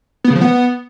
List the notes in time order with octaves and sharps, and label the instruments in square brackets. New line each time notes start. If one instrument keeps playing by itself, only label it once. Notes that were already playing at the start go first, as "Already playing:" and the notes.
[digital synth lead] B3
C#3
F3
B3